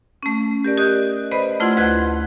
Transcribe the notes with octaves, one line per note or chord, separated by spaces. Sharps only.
A3 C#4
G4 A#4 D5
G4 D#5 D#6 F#6
B4 C5 D5 D#5 B5
A3 E4 F4 F#5 C6 G#6
D2 B4 F#6 G#6